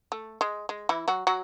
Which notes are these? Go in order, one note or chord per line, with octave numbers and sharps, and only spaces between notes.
A3
G#3
G#3
E3 E4
F#3 F#4
F#3 F#4